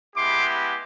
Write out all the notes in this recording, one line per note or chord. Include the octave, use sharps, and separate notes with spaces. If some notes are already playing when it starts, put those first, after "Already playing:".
G#3 B3 E4 G4 C6 D6